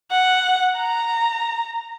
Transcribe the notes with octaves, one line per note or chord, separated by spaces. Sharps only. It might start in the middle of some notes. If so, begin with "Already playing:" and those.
F#5
A#5